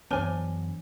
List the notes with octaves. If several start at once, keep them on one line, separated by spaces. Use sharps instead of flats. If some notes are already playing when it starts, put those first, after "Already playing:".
F#2 E3 B3 D4 C5 C#5 G#5 A5